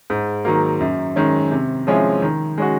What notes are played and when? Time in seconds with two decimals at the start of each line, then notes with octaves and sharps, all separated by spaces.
0.10 G#2
0.45 D#3 F#3 A#3
0.80 F#2
1.16 D#3 G#3 C#4
1.52 C3
1.87 F3 G#3 C#4 E4
2.22 D#3
2.58 G#3 C#4 F#4